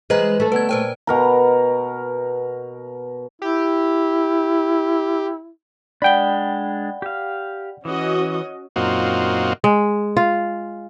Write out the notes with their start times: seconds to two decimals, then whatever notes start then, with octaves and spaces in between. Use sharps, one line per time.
0.10 E3 G#3 B4 C5 D#5 A#5
0.40 A3 A4
0.52 D2 B3 B4 G#6
0.69 A#2 B4 C5 G5 A5
1.07 B2 A#4 A#5
3.42 E4 G4
6.02 G#3 D4 D5 F#5 G5 B5 G7
7.02 G4 F5
7.85 E3 C#4 F#4 D#5
8.76 F#2 A#2 C4 D#4 F4 F#4
9.64 G#3
10.17 F4